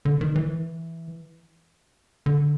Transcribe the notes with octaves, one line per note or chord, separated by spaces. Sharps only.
D3
D#3
E3
D3